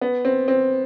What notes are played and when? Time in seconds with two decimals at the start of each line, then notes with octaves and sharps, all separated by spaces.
0.01 B3
0.25 C4
0.48 C4